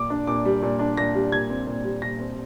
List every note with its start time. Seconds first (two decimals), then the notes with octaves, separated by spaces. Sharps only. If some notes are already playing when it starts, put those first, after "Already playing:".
Already playing: A#2 D6
0.10 D4
0.27 A#2 D6
0.45 G3
0.62 A#2
0.79 D4
0.97 A#2 A#6
1.15 G3
1.32 A#2 G#6
1.50 C4
1.67 A#2
1.84 G3
2.02 A#2 A#6
2.19 C4